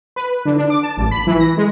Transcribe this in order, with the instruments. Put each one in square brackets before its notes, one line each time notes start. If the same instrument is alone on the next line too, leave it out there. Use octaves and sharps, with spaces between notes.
[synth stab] B4
D3
D4
D6
A5
A1
B5
E3
A#6
G#3